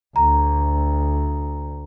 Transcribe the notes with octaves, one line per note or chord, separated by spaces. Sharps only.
D2 A#5